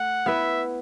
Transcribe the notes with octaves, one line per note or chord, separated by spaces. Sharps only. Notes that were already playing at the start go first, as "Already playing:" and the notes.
Already playing: A3 F#5
B3 E4 B4 E5